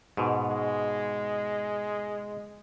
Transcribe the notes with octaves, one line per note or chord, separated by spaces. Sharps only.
G#2 B2
G#3